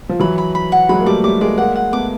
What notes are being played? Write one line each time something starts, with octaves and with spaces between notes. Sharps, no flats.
F3
E3 F#3 B5
B5
B5
F#5
F#3 G#3 B5
A#3
G3 A3 D6
G3 A3 D6
G#3 A#3 D5
G#3 A#3 F#5
F#5
A3 B3 D6